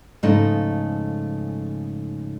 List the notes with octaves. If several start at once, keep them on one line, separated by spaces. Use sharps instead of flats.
G#2 C#3 F3 A3 D#4 D#5